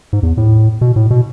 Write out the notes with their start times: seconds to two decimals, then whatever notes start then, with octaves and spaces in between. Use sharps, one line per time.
0.13 G#2
0.23 E2
0.38 A2
0.81 B2
0.96 A2
1.11 B2